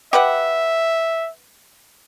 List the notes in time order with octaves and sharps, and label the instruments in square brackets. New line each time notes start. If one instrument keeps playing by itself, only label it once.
[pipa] G4 B4 F#5 [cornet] E5